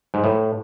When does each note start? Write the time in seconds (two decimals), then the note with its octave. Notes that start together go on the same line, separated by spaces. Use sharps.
0.14 G#2
0.24 A2